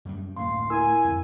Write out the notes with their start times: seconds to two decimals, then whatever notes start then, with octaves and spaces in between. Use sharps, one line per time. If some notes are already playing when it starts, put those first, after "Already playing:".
0.05 F#2 G3
0.37 D2 A2 A#3 F5 C6
0.70 E4 A#4 G#5 E6
1.04 F2